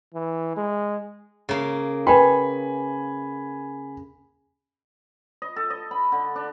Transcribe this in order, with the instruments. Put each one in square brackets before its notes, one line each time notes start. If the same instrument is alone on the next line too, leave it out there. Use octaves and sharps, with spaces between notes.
[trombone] E3
G#3
[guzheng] C#3 A#3
[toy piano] B4 C5 G5 [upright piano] G#5 B5
[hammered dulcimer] D#5
A4
D#5
B5
D3
D4